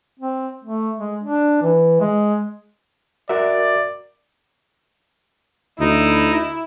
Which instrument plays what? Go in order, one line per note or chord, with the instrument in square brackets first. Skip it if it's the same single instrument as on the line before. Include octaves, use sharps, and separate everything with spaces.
[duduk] C4
A3
G#3
D4
E3
G#3
[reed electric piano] F#4 A#4 E5 [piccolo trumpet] D5
[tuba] D2 [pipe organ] D#4 [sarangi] E4